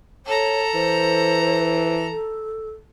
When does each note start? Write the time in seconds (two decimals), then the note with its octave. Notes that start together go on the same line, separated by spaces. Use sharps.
0.26 A4 C#5 A#5
0.74 E3 C5
2.10 A4